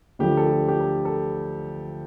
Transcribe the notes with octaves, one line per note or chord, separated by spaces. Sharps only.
D2 D3 F3 G4
A4
G4
G4
A4
A4